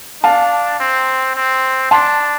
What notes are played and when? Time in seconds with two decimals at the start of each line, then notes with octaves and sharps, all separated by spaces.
0.23 D4 F5 A5
0.80 C4
1.36 C4
1.91 D4 A5 C6